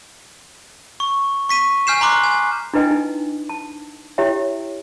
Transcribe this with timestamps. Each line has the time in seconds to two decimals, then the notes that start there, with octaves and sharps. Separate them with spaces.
1.00 C#6
1.49 C#6 B6 D#7
1.87 G#5 F6 G6 C7 E7
2.01 A#5 C6 D6 F#6
2.23 G#5
2.74 D4 E4 B4 D#5 G5 G#5
2.91 D#4
3.49 A5
4.18 E4 G4 C#5 E5 G5